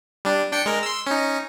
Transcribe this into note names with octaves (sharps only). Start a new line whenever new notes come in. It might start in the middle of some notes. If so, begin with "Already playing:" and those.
G3 D4
D4 G5 C#7
G#3 A#4
C6 E6
C#4 D#4